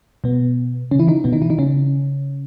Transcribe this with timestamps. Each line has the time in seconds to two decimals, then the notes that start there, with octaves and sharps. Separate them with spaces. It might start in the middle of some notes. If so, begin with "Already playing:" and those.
0.24 B2 B3
0.91 C#3 C#4
0.99 E3 E4
1.08 D#3 D#4
1.24 B2 B3
1.33 D#3 D#4
1.42 E3 E4
1.50 D#3 D#4
1.59 C#3 C#4